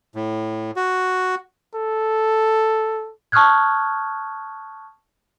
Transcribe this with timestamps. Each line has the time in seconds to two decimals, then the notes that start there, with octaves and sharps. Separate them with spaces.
0.15 A2
0.76 F#4
1.75 A4
3.32 A5 C#6 D#6 F6 F#6 G#6